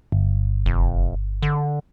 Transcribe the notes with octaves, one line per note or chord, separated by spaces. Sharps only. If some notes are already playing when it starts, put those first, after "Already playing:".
G1
F1
D3